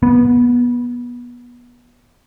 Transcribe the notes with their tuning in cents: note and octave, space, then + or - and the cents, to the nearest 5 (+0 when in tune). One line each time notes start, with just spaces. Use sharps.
B3 -25